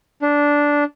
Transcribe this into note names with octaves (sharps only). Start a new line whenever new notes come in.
D4